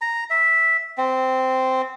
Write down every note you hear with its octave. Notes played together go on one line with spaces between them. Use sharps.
A#5
E5
C4